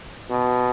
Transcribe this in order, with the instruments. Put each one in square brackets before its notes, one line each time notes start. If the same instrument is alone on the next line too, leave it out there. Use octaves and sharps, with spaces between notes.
[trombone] B2